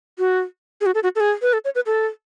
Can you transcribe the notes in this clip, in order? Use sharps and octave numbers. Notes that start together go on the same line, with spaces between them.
F#4
G#4
F#4
A4
F#4
A4
G#4
B4
A4
C#5
B4
A4